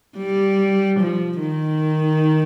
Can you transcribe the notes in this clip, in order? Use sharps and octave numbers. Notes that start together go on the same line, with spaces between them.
G3
F3
D#3